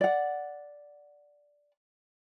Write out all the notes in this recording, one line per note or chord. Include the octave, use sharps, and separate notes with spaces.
D5 F#5